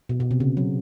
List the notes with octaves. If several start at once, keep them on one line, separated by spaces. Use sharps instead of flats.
B2
B2
C3
C#3
F#3